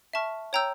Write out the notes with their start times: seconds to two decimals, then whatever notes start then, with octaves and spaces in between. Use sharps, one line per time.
0.13 E5 A5 C#6 F6
0.53 C#5 G5 A#5 E6 G6